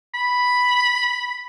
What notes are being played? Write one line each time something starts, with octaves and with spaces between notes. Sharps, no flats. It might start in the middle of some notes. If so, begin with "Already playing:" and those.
B5